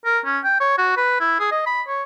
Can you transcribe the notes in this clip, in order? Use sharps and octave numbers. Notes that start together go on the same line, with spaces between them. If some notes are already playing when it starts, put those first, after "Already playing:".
A#4
C#4
G5
C#5
F#4
B4
E4
G#4
D#5
B5
C#5